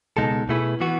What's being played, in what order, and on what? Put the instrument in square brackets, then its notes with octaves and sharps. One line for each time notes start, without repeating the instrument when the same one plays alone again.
[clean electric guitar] C#2 B2 G#3 D#4 A4
B2 A3 E4 G#4 B4
E3 B3 F#4